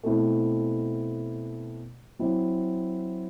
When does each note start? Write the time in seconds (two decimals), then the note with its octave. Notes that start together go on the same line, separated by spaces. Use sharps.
0.03 B2 A3 C4 E4
2.19 F#3 C4 E4